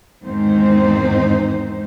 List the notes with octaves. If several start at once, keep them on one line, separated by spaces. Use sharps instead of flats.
E2 G#2 D#3 C4 D#4 C5